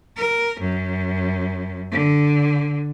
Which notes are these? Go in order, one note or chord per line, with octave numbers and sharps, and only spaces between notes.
A#4
F#2
D3